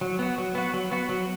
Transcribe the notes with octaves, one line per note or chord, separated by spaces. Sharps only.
F#3
B3 F#4
F#3
B3 F#4
F#3
B3 F#4
F#3